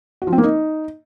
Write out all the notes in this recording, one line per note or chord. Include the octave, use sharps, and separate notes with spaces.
F#4
F3
C4
A#3
D#4